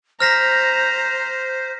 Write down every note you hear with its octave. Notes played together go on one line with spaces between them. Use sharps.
C5 A#5 F6 A#6 B6